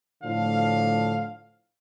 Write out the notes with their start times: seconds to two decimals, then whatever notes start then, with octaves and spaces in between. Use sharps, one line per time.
0.23 A2 D3 F3 F5